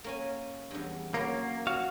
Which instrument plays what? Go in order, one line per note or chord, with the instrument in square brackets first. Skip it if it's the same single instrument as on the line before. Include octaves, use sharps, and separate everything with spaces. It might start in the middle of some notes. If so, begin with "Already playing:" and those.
[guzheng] A#3 C#4 G#5
E2 G2
[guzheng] F#3 C#4 C#5 [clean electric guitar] A#3
[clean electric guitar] F#4 F5